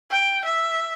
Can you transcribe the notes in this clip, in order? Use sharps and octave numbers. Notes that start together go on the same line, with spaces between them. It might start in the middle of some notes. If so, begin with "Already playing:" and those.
G5
E5